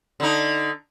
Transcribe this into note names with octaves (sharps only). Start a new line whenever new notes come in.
D3 D#4